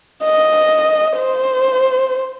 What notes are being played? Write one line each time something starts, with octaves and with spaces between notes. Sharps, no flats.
D#5
C5